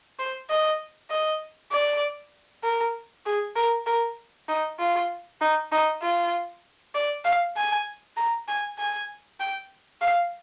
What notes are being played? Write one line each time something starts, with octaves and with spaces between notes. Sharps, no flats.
C5
D#5
D#5
D5
A#4
G#4
A#4
A#4
D#4
F4
D#4
D#4
F4
D5
F5
G#5
A#5
G#5
G#5
G5
F5